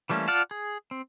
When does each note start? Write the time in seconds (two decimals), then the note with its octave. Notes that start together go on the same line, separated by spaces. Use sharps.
0.10 E3 G3 A3 A#3 C#4
0.28 F4 D5 F5 F#5 A5
0.51 G#4
0.91 C4